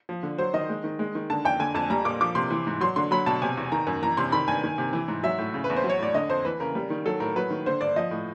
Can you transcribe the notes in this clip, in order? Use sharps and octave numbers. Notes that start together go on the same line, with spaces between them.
F3
D3
F#3 C5
D#3 D#5
G#3
D#3
G#3
D#3
D3 A5
F2 G5
D3 G#5
F2 A5
G3 A#5
A#2 D6
F3 D6
C3 C6
E3
G#2
F#3 C6
D3 C6
F#3 B5
B2 A5
C3 G#5
E2
D#3 A#5
F#2
E3 A#5
C3 C6
D#3 B5
G2 G#5
D#3
C3
E3
G#2
F#3 E5
A2
C#3
B4
E2
C5
F#3
C#5
A2 D5
D3 D#5
F2 C5
E3 B4
C#3 A#4
G3
D#3
F#3 A4
A2 A#4
F#3 B4
D#3
D3 C5
G2 D5
F3 D#5
A2